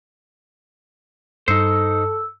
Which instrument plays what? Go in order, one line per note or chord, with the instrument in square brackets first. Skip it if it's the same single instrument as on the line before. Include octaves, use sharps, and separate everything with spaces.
[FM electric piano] G2 C#7 [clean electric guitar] D#4 C5 [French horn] A4 [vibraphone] E6